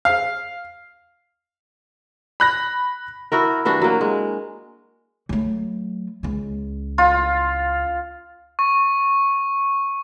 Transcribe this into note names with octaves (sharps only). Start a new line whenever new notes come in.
F5
B5 F#6 A#6
E4 F#4 A#4
G2 E3 D4 F#4
F#3 A#3
G#3
F#3 A3
C#2 C#4
F4
C#6